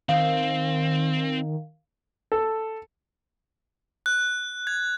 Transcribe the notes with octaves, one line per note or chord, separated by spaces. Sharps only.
D#3 C4 F5
A4
F#6
G#6